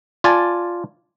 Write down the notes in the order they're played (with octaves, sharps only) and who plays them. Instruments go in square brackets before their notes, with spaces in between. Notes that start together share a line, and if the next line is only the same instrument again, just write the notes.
[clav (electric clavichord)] F4 D5 G#5 A5